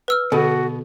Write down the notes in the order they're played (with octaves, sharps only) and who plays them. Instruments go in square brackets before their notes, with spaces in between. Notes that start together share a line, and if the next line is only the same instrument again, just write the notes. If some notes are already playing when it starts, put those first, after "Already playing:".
[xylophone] B4 E6 F6
[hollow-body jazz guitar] B2 [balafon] D3 A4 [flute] F#4